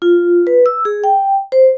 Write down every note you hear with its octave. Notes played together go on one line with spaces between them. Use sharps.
F4
B4
E6
G#4
G5
C5